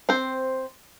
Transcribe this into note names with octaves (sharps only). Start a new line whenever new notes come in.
C4 C5